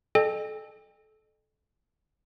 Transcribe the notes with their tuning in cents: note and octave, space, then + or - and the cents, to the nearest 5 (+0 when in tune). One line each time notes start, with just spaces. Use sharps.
A4 -25 D#5 -40 G5 +35